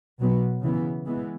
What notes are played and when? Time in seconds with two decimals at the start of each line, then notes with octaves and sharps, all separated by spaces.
0.19 B2 F#3 B3
0.62 C#3 E3 B3
1.06 E3 G#3 B3